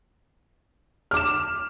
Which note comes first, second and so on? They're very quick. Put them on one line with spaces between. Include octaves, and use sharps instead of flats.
F6 D6 E7